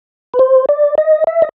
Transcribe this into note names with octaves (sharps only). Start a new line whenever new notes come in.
B4
C5
D5
D#5
E5
D#5